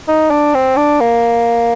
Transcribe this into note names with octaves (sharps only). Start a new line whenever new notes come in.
D#4
D4
C4
D4
A#3